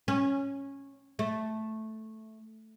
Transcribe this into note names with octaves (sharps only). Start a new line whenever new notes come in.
C#4
A3